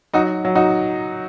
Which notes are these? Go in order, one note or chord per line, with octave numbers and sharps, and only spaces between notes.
F#3 D#4 F#4
F#3
D#4 F#4